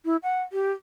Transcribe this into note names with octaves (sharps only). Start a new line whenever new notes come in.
E4
F#5
G4